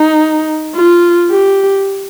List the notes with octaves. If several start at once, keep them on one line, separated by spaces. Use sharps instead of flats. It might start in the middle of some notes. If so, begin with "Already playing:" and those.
Already playing: D#4
F4
G4